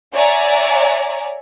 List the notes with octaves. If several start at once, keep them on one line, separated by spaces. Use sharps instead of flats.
C#5 D5 E5 F#5 G#5 A#5